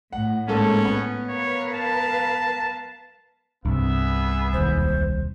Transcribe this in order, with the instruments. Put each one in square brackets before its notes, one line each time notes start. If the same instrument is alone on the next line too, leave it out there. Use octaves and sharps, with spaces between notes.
[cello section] A2 [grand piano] F#5
[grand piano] G#2 A#3 A4 [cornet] C#4
[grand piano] B3
[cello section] A#4 B4 F5 [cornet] C#5
[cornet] A5
[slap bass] C2 [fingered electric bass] G2 C3 [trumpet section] B3 G#4 E5
[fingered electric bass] E1 D#2 [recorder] C5